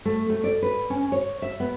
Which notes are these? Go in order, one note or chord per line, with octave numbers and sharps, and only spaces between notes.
A3
A3
D5
B4
C#4
C#5
E5
B3